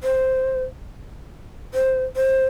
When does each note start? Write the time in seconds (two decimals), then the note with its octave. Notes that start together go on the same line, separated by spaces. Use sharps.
0.03 C5
1.74 C5
2.16 C5